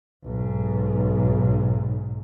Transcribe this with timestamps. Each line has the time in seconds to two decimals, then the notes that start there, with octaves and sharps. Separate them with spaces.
0.23 B1 G#2